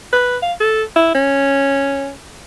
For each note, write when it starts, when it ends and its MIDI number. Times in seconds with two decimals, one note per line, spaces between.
0.13 0.37 71
0.42 0.53 77
0.60 0.83 69
0.96 1.11 64
1.15 2.11 61